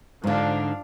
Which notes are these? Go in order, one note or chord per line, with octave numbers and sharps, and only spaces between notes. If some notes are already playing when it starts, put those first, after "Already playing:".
G#2 D3 F3 D4 F5